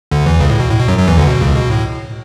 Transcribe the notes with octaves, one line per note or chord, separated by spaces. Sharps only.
D2 D3
E2 E3
C#2 C#3
A2
B2
A2
B2
F#2 F#3
F#2 F#3
E2 E3
D2 D3
B2
C#2 C#3
B2
A2